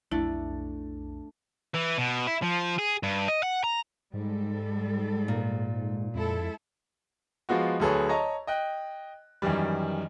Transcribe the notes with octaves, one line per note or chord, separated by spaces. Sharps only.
B1 F2 A3 D4 E4
E3
B2
E4
F3
G#4
G2
D#5
F#5
A#5
G#2 G3 G#3 A4
A#2
F2 G#3 E4 A4
F3 G#3 B3 F4 F#4
D2 F#3 G#4 A4 B4 C#5
C#5 D#5 A5 A#5
D#5 G5 F#6
F#2 D#3 E3 G3